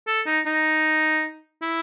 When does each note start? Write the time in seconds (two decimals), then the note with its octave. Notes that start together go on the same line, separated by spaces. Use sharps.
0.07 A4
0.26 D#4
0.46 D#4
1.62 E4